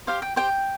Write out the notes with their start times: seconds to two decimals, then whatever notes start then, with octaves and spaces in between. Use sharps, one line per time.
0.07 G4 C5 F5
0.22 G5
0.36 G4 C5 G5